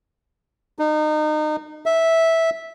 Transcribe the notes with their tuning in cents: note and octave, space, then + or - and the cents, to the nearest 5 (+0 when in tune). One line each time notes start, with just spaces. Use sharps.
D#4 -30
E5 -10